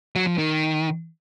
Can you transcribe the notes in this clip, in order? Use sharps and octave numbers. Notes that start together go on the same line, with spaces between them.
F#3
F3
D#3